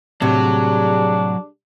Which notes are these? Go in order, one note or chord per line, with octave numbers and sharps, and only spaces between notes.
A2 C3 F#3 G3 D4 G4 G#4